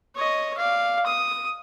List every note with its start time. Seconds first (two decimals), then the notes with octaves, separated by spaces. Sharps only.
0.16 C#5 D#5
0.58 D5 F5
1.06 D#6